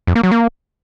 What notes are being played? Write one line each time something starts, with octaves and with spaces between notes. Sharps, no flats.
F2
A#3
F#3
A#3